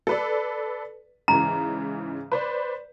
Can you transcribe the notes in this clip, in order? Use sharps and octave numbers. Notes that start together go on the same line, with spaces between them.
A4 B4 D5
G#2 C#3 E3 A#5
B4 C5 D5